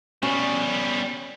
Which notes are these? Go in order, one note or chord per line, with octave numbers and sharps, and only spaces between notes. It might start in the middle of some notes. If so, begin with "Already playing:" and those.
B2 G3 C#4